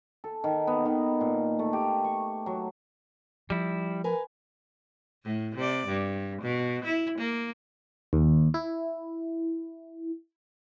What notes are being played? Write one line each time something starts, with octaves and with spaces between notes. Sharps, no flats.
A4
D#3
B3
D#3
A#2
A3
G4
C#6
F#3
F3 G3 E4
A#4 B4 G#5
A2
C3 D5
G2
B2
E4
A#3
D#2
E4